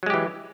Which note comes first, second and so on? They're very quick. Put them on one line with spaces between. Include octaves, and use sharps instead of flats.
F#3 G#3 G4 E3